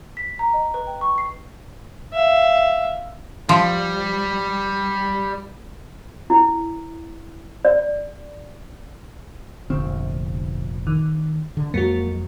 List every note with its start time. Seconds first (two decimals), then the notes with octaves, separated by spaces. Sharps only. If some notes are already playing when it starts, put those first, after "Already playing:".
0.17 B6
0.39 A#5
0.53 D#5
0.74 B4
0.87 G5
1.01 C#6
1.18 C7
2.13 E5 F5
3.49 F3 G3
6.30 E4
7.65 D5
9.70 F1 A#1 D3 C4
10.87 D#3
11.57 D3
11.74 F2 F#3 G#3 A#3 F#4